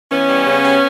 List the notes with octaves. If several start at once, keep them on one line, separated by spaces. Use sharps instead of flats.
E3 B3 C#4
G3
C#3
G3